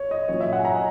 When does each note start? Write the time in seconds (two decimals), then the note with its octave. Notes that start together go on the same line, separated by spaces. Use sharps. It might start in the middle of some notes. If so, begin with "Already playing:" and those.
Already playing: C#5
0.11 D#5
0.29 A#2 F#3 C#4 C#5
0.41 E5
0.53 F#5
0.59 G#5
0.65 A#5
0.73 D#5